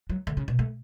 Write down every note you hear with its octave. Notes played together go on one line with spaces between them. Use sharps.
F#3
D3
C#3
B2
A3